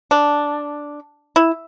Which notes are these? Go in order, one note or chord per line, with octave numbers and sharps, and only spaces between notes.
D4
E4